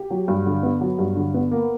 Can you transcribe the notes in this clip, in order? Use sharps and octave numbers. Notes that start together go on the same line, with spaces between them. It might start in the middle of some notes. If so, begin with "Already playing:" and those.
Already playing: G4
F#3
G2
D3
B3
F#3
G2
D3
B3
A#3